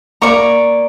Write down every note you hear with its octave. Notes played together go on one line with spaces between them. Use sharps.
A#3 D5 A#5 C#6